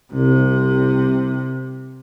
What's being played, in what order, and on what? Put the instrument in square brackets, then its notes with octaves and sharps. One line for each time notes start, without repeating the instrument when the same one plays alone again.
[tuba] C2 [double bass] C3